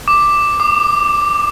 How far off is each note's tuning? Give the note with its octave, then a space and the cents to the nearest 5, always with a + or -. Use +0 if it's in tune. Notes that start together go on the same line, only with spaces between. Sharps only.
D6 +5
D6 +40